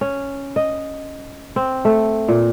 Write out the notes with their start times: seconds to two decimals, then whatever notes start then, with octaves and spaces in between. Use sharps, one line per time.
0.01 C#4
0.56 D#5
1.56 C4
1.85 A3
2.29 A#2